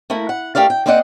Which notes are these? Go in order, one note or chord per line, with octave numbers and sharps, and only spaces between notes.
A3 A#3 E4 A#4
F#5
A3 G4 A#4 D5 F5
G5
A#3 C4 C5 D5 D#5 F#5